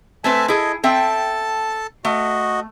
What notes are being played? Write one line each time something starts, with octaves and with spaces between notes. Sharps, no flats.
A3 C4 B4 E5 G#5 A5
E4 G#4 A4 D#5
C4 A4 E5 G5 A5
A3 F#4 D#5